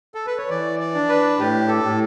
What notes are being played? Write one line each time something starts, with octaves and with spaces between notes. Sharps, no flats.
A4
B4
C#5
E3 D5
D5
D4
B4
A2 G4
A4
A2